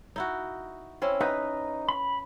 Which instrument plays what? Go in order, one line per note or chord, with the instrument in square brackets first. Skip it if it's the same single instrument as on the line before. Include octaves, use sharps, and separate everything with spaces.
[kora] D#4 E4 F#4
C4 C#4 E4
[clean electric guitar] D#4 [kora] B4
[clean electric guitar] B5